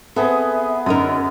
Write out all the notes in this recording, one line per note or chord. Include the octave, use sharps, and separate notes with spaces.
B3 C4 G#4 A4 E5
F#2 D3 D#4 A#4